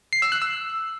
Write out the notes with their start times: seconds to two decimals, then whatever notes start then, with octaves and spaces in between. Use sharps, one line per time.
0.13 C7
0.22 E6
0.32 F#6
0.42 E6